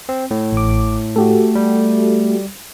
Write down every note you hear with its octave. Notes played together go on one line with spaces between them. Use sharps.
C4
A2
A1 D6
A3 F#4 G4 A4
G3